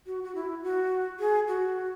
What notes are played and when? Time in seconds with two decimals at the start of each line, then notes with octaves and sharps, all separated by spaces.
0.06 F#4
0.23 F#4
0.35 E4
0.63 F#4
1.20 G#4
1.48 F#4